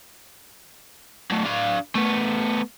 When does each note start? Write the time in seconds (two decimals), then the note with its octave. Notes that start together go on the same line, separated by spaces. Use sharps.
1.31 F#3 A3
1.44 D4 F5
1.95 A3 B3